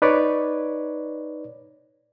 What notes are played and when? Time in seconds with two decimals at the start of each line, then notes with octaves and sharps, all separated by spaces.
0.02 D#4 B4 C#5 D5